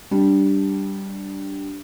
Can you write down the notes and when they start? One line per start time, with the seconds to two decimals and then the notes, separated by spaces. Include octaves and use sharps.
0.11 G3 D4